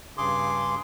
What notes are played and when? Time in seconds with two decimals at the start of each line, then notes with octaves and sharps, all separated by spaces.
0.18 G2 C#3 G#4 C6 D6